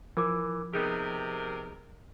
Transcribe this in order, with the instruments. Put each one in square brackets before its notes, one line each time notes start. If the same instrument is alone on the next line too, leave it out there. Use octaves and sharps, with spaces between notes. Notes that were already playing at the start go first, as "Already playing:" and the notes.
[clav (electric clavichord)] E3 [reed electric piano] F3 [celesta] A#4 D6
[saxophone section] C3 A#4 [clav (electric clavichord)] B3 D#4 G4 [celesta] G#4